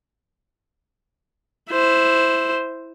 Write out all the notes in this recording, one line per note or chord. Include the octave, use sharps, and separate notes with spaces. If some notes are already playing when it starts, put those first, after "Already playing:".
E4 C5